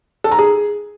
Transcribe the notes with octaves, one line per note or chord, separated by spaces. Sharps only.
A4
A#5
G#4